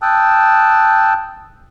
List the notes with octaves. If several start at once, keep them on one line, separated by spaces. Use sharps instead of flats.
G5 A5 D#6 E6 F#6